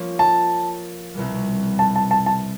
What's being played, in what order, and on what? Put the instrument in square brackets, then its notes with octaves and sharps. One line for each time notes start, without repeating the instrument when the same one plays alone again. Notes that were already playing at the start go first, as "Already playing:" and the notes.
Already playing: [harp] F3 A#3 C#4
[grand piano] A5
[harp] C2 B2 G3
[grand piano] A5
A5
A5
A5